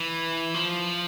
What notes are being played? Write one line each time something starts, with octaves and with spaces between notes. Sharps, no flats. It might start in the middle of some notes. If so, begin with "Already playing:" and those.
Already playing: E3
F3